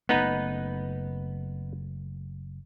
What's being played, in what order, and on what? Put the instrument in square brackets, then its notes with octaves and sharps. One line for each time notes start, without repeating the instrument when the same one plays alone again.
[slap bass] F#1 A3 [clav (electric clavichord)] B3 D#4 B4